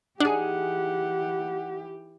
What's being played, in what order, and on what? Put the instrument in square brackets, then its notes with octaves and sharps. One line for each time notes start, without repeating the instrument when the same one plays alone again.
[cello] E3 G4 [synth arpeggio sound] D4 [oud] D#4 G#4 [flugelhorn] F#5